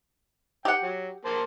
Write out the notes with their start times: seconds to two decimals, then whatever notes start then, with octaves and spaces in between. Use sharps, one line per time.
0.65 G4 F#5 G5
0.83 F#3
1.25 A#3 C5 A5